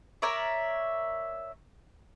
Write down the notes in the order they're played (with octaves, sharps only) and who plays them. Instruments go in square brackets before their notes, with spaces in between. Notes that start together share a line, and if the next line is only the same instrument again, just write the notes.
[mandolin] A#4 C#5 D5 E5